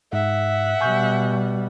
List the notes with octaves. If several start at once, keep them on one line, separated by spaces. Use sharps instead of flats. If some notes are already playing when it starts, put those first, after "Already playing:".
G#2 E5 F#5
B2 G3 G#5 C#6 G6